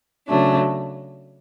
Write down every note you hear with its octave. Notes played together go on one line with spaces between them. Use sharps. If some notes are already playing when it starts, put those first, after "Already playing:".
C#3 F#3 A3 D4